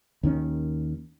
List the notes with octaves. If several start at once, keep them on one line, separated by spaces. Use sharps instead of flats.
D#2 D#3 C#4